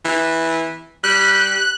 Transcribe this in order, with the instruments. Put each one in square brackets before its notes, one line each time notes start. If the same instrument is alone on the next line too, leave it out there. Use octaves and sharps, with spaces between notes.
[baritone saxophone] E3
[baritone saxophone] G3 [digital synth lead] F#6